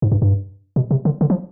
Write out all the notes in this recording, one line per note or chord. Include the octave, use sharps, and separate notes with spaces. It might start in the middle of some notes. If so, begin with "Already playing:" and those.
G#2
G2
G2
B2
C3
D3
D3
F3